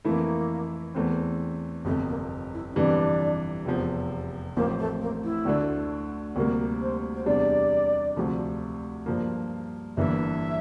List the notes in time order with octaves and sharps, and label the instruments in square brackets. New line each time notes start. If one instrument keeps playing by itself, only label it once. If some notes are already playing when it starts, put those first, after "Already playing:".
[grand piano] F2 E3 A3 E4 [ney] A#3
[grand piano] E2 E3 A3 C4
[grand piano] G1 F2 C3 [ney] A3
[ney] A#3
E4
C4
[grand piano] G1 F2 C3 E3 G3 [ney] D4
[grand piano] F1 E2 C3 F3
[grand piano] A1 A2 F3 C4 [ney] A#3
[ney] A3
A#3
E4
[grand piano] D2 D3 A3 D4
[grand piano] D2 C3 G3 A#3 [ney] A#4
[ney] C5
C5
[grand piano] E2 C3 G3 D4 [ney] D5
[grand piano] D2 C3 F3 A3
G2 F3 A#3
[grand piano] G1 G2 E3 A#3 D4 [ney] E5